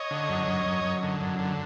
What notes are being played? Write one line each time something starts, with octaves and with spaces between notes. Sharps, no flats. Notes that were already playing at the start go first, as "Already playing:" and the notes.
Already playing: C#5 D#5
D3
F#2
F#2
F#2
F#2
D3
F#2
D3